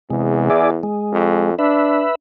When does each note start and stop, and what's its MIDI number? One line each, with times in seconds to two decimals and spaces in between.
0.10 0.82 40
0.10 0.49 48
0.10 0.49 56
0.50 0.70 64
0.50 0.70 68
0.50 0.70 74
0.83 1.51 56
1.13 1.56 41
1.59 2.05 62
1.59 2.15 71
1.59 2.15 76